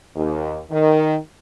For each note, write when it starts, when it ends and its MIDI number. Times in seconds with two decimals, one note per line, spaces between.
0.16 0.58 39
0.71 1.15 51